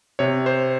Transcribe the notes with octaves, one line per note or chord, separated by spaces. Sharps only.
C3 C#5
C5